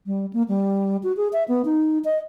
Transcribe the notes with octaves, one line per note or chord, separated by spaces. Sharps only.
G3
A#3
G3
F#4
G#4
E5
B3
D#4
D#5